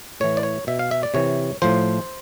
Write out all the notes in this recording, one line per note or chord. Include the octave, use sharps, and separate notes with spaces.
A2 E3 C#5
D5
C#5
B2 E5
F5
E5
D5
C3 E3 C#5
A2 F3 C5